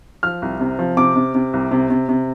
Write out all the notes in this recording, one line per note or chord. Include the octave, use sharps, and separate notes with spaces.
F3 F6
C2
C3
F3
C3 D6
C3
C3
C2
C3
C3
C3